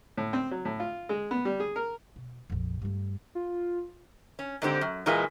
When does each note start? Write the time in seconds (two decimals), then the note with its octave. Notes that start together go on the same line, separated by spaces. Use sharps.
0.18 A2
0.33 C4
0.51 F#3
0.65 A2
0.80 F4
1.09 G#3
1.31 B3
1.45 G3
1.60 G#4
1.76 A#4
2.16 B2
2.50 A#1 F2
2.82 G2 A3
3.35 F4
4.39 C#4
4.62 G#2 D3 C4 G4
4.81 F#2
5.06 A#2 E3 G#3 A#3 G#5